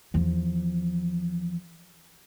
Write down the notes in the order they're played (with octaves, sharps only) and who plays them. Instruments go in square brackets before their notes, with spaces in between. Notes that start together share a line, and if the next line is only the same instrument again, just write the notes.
[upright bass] E2 F3